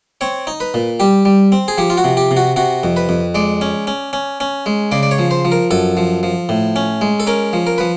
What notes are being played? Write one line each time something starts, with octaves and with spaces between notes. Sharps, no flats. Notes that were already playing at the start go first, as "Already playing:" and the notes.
C4 C#5
D#4
B4
A#2
G3 G4
G3
C4
G#4
F3 G4
F4
F#4
C3
G4
C3
F#4
C3 F#4
F2
B4
F2
G#3 D5
C#4
C#4
C#4
C#4
G#3
C#3 D5
D5
C#5
F3
C5
F3
A#4
F#2 A4
F3
F3
A2
C#4
G#3
A4
C#4 A#4
F3
A#4
F3 B4